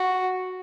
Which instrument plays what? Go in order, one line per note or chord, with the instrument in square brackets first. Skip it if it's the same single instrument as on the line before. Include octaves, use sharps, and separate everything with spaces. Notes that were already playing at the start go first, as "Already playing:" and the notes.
Already playing: [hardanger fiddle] F#4